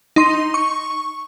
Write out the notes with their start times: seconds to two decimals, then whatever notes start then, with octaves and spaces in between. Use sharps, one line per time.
0.16 D#4 C6
0.54 C#6